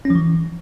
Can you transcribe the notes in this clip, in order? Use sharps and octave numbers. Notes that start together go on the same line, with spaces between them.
C#4
F3
E3